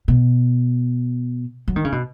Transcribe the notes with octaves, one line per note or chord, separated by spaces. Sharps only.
B2
F#3
D#3
C#3
B2